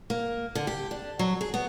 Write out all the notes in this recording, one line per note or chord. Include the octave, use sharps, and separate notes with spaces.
A#3
D3
G4
D4
F#3
G#4
B3